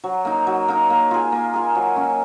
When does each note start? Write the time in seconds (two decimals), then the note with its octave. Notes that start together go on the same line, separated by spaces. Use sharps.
0.04 F#3
0.25 A#3 D#4
0.47 F#3
0.68 A#3 D#4
0.90 A#3
1.11 F4 G#4
1.32 A#3
1.54 F4 G#4
1.75 F#3
1.96 A#3 C#4